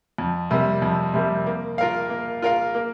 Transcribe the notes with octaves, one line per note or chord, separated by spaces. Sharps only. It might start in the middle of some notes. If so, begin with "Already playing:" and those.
F2
C3 G3 A#3
F2
C3 G3 A#3
A#3
F4 A#4 F5
A#3
F4 A#4 F5
A#3